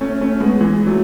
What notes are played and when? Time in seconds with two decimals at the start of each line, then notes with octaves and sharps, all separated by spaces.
0.01 A3 C#4
0.21 A3 C#4
0.40 G#3 B3
0.61 E3 G#3
0.86 F#3 A3